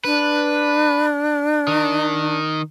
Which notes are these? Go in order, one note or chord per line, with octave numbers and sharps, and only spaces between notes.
D4 B4
D#3